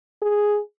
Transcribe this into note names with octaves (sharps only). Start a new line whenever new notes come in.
G#4